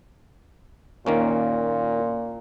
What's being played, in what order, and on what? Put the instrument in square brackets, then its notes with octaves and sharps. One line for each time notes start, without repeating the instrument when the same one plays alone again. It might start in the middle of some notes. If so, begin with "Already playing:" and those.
[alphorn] A#2 [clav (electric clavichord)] D#3 A#3 C#4